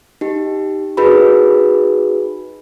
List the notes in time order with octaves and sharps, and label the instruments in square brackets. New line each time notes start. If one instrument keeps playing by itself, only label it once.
[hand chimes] D#4 G4
D#4 F#4 G#4 B4 B5